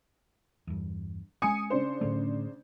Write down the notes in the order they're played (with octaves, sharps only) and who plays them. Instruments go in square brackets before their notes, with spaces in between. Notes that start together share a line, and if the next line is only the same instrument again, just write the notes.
[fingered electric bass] E2 G2
[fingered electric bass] G#3 C#4 [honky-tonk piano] G#5 D#6 C#7
[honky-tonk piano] C#3 D4 C5
[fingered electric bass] A2 D3 A3